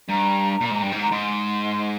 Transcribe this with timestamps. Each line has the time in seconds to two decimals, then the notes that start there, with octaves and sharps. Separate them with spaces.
0.09 G2 A#5
0.61 A#2
0.71 G#2
0.82 G2
0.92 G#2
1.02 A#5
1.12 G#2 C6